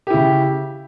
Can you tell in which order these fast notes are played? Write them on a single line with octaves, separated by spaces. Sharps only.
G4 E4 C#3